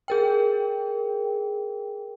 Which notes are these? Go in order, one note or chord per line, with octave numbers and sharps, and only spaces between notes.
G#4 A#4 G5